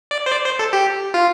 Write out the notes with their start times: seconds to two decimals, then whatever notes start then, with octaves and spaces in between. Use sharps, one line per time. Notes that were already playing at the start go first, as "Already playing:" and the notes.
0.11 D5
0.26 C5
0.32 D5
0.45 C5
0.59 A4
0.73 G4
1.14 F4